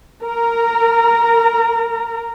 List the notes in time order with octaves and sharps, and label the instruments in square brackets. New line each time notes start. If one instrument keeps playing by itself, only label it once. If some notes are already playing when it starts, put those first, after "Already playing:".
[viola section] A#4 A#5